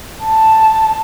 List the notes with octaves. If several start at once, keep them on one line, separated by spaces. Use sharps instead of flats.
A5